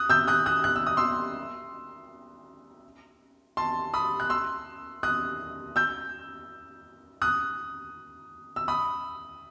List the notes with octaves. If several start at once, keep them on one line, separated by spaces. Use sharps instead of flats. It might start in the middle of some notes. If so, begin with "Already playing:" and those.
Already playing: D#6 F#6
E6 G6
D#6 F#6
D#6 F#6
F#6
E6
D#6
C6 E6
A5 C6
B5 D#6
F#6
C6 E6
D#6 F#6
E6 G6
D#6 F#6
E6
B5 D#6